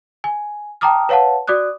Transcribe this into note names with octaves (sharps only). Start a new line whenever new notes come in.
G#5
G5 A5 A#5 D6 D#6 F6
B4 C#5 F5 F#5 A5
F#4 D5 D6 D#6 F#6